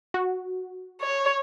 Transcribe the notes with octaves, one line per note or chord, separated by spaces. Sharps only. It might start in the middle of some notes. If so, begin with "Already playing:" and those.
F#4
C#5